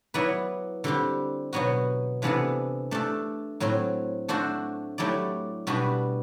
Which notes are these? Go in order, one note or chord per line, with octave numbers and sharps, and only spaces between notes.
F#3 B3 E4 B4 D5
D3 G3 C4 G4
B2 F#3 B3 F#4
C3 E3 B3 D4 A4
A3 D4 A4
A2 F#3 C4
A3 D4 F#4 A4 C5
F#3 A3 E4 G4 D5
B2 G3 D4 F#4 B4